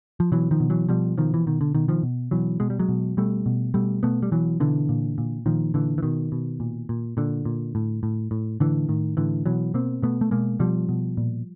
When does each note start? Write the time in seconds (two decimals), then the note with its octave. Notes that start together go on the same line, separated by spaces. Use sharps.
0.20 F3
0.32 B2 E3 F#3
0.51 D#3 F3
0.60 B2
0.70 E3 F#3
0.89 B2 F3 G3
1.18 B2 D#3 F3
1.34 E3
1.47 B2 D#3
1.61 D3
1.75 B2 D#3
1.88 D#3 F3
2.03 B2
2.31 B2 E3 F#3
2.60 B2 G#3
2.70 G3
2.80 F#3 G#3
2.89 B2
3.17 B2 G3 A3
3.46 B2
3.74 B2 G3 A3
4.03 B2 A3 B3
4.23 G3
4.31 B2 E3 F#3
4.60 B2 D3 E3
4.89 A#2
5.18 A#2
5.46 A#2 D#3 F3
5.74 A#2 D3 E3
5.98 E3
6.03 B2 D#3
6.32 B2
6.60 A#2
6.89 A#2
7.17 A#2 D3
7.45 A#2
7.75 A2
8.03 A2
8.31 A2
8.60 A2 D3 E3
8.89 A2 D#3
9.17 A2 D3 E3
9.46 B2 E3 F#3
9.74 B2 A#3 C4
10.02 B2 A3 B3
10.21 A3
10.31 B2 G#3 A#3
10.60 B2 F3 G3
10.89 B2
11.17 A#2